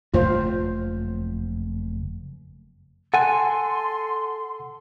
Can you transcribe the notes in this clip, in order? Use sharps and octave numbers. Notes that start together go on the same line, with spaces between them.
F#1 F2 A3 F4 C5
A4 F#5 G#5 C6